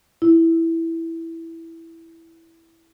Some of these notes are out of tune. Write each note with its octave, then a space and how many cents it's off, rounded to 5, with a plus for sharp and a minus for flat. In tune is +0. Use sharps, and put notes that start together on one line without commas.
E4 +0